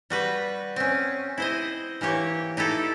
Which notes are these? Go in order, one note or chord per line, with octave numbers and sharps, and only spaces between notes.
G3 F#4 B4
C4 C#4
E4 C5 D#5
E3 A#3 G4 C#5
D#4 E4 G4 A4